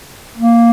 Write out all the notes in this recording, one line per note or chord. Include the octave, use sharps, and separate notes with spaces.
A#3